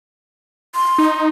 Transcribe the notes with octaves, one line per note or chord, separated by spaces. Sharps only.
C6
D#4